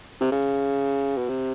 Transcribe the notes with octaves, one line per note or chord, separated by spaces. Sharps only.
C3
C#3
B2
C3